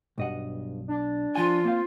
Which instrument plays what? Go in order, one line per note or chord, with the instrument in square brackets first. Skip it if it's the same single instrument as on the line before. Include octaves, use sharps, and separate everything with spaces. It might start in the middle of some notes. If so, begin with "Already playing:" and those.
[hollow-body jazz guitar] B1 D#5 F#5 [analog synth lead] G2
[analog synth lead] D4
[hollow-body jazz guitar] F3 G#5 [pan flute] F4
[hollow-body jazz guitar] A#3 C4 F5